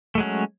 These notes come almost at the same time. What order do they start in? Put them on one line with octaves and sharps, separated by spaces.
A3 G#3 F#3 C#4